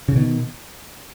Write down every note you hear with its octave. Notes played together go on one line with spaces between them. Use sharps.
C#3
B2 D#3